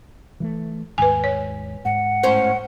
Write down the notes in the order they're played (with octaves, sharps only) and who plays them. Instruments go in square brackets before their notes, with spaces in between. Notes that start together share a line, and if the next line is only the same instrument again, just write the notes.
[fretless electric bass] E3 F#3 A3
[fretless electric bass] D#2 G#2 [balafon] B4 G#5
[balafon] C#5
[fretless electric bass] G#2 [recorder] F#5
[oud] A2 C#4 C5